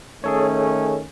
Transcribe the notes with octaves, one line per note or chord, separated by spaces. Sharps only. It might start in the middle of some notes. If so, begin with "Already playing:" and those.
D#3 A3 C#4 G#4 A4 C#5